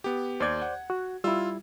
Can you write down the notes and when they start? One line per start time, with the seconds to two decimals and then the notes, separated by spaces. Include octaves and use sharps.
0.04 B3 G4
0.40 D#2 C5 D5 G6 G#6
0.62 F#5
0.90 F#4
1.24 G3 E4 F4 E6